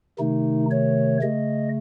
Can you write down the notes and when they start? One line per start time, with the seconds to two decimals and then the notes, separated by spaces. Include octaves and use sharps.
0.19 C3 D#3 A3 D#4
0.71 C#5
1.22 C#3 A3 D#5